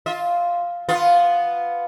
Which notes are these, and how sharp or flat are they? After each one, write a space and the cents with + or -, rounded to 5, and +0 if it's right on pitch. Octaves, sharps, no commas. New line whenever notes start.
F4 +0 E5 -45
B3 +0 F4 +0